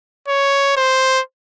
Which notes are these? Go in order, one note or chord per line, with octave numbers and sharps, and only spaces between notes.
C#5
C5